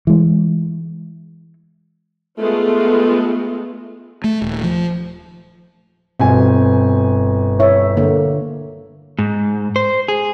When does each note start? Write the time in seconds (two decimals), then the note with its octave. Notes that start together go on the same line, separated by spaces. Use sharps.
0.07 E3 G#3
2.40 G#3 A3 B3 F4
4.24 A3
4.42 D#1
4.63 F3
6.20 G1 B2 C4 G#5
7.60 E4 C#5 E5
7.97 D3 A#3
9.19 G#2
9.76 C5
10.08 G#4